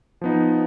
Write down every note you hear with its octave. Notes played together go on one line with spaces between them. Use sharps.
F3 B3 D#4